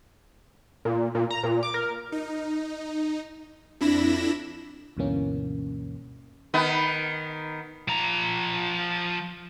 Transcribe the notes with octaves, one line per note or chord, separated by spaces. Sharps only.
A#2
A#2
A#5
A#2
D6
A#4
D#4
F2 D4 E4 B5 A#6 E7
D2 G2 B2 E3 A#3 C#4
D#3 B3
F3 A#5